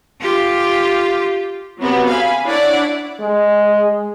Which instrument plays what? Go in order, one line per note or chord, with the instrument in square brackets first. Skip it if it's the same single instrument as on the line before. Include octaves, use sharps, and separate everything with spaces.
[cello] F4 G4
[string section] C3 F#3 B3
F5 G#5 B5
D4 E4 C#5 D5 F#5
[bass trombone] G#3